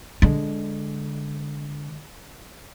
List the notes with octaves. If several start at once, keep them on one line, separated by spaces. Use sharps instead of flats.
D3 G#3